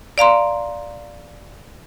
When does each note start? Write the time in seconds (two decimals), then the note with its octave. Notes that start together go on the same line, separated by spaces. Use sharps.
0.18 D5 F5 A#5 C6